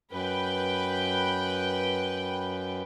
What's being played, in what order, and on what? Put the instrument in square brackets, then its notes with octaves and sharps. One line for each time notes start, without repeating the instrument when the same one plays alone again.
[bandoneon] F#2 [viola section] B4 G5